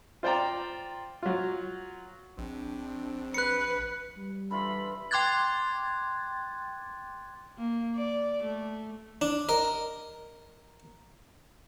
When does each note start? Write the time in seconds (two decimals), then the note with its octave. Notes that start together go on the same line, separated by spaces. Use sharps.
0.23 F4 C5 D5 G5 A#5
1.23 F#3 F4
2.38 A#1 C4 D4
3.34 B4 F#6 C#7
4.17 G3
4.51 D3 E3 F4 B5
5.11 G5 C6 D6 F#6 G#6 A6
7.58 A#3
7.96 D5
8.43 A3
9.22 D4
9.49 A#4 D#5